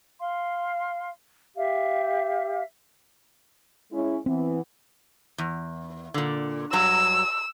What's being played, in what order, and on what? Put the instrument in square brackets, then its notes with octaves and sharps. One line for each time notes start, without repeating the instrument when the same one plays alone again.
[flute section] F5 C6
G4 E5 F5
[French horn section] G#3 C#4 E4
[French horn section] E3 B3 [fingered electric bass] C4
[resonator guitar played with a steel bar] E2
A#2 D3
[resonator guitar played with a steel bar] G2 F#3 A#5 [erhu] E6